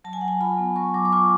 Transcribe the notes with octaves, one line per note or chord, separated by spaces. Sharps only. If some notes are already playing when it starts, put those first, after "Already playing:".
F#3 A5
G#5
F#3 F#5
G#5
F4 B5
B3
F#3 C#6
F#3 D6
D6
F4 C#6